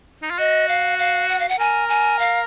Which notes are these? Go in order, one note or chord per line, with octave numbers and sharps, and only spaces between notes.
D#4
F4
F#4 D#5
F5
F5
F#5
F5
F#5
A#4 G#5
G#5
F5